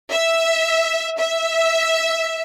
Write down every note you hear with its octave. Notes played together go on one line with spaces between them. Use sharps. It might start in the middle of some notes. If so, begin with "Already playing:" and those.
E5
E5